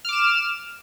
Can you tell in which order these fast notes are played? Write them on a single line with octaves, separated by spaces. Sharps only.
F6 D6 E7